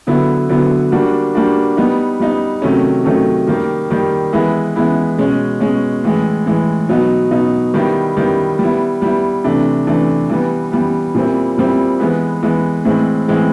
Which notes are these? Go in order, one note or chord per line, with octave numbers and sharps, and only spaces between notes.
D3 F#3 B3 E4
D3 F#3 B3 E4
G3 A#3 D4 F#4
G3 A#3 D4 F#4
G3 B3 D#4
G3 B3 D#4
C3 D#3 F#3 A3 C#4
C3 D#3 F#3 A3 C#4
D#3 G3 A#3
D#3 G3 A#3
E3 G#3 B3 E4
E3 G#3 B3 E4
B2 G#3 C#4
B2 G#3 C#4
A2 E3 G#3
A2 E3 G#3
B2 F#3 B3 D#4
B2 F#3 B3 D#4
D#3 G3 B3 E4
D#3 G3 B3 E4
G3 B3 E4
G3 B3 E4
C3 E3 A3 D4
C3 E3 A3 D4
E3 G3 B3
E3 G3 B3
A#2 G3 C4 E4
A#2 G3 C4 E4
E3 G#3 B3
E3 G#3 B3
A2 E3 G#3 C4
A2 E3 G#3 C4